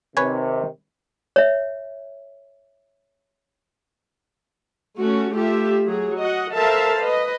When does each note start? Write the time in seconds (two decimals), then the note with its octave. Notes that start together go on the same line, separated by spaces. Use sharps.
0.17 C3 D#3 B4 C#5 G#5
1.36 C#5 E5
4.98 A3 C#4 F#4
5.33 A3 F4 G4 E5
5.86 F#3 G#4
6.18 F#4 D#5 F#5
6.54 A4 A#4 C5 E5 F5 A5
7.01 B4 D#5